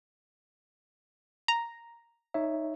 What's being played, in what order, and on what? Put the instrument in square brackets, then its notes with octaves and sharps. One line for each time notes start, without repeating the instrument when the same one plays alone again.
[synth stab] A#5
[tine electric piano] D#4 C#5 E5